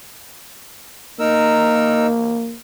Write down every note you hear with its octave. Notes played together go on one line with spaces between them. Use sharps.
A#3 D#4 A#4 E6